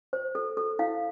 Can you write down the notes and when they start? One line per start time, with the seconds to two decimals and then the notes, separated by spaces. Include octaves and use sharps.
0.13 C5
0.35 A4
0.57 A4
0.79 E4 F5